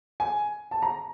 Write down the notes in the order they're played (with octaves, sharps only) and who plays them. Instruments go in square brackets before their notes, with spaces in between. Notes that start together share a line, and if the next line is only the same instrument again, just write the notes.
[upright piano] G#5
A5
A#5